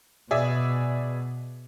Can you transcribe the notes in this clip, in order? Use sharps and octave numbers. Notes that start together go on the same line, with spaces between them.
B2 G#4 D5 E5